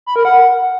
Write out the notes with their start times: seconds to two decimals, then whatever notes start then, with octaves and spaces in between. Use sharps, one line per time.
0.06 B5
0.16 A#4
0.25 F#5